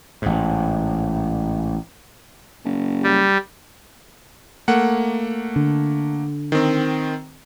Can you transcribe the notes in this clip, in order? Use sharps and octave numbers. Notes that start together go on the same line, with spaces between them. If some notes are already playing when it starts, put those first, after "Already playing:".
A1 G#2
F#1
G3
A3 A#3 F#5
D3
D#3 C4